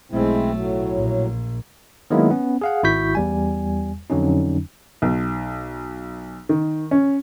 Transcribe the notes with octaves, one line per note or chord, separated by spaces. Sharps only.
B1 G#3 A3 C4 E4
A2 F#3
A#1
D#3 F#3 G#3 A#3 B3 E4
B3 C#4
G#4 F5 F#5
G#1 E4 F#4 C#6 G6 B6
E2 G3 G#5
F2 D3 F#3 C#4 D#4
B1
D#3
C#4